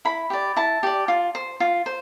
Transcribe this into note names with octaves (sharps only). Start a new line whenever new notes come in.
E4 B5
G4 D5
E4 A5
G4 D5
F4
C5
F4
C5